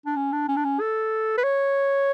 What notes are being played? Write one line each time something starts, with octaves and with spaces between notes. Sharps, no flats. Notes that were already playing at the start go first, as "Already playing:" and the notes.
D4
C#4
D4
C#4
D4
C#4
A4
B4
C#5